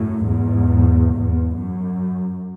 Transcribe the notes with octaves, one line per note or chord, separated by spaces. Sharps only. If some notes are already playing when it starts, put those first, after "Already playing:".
Already playing: F#2 A2
E2 G#2
E2
F#2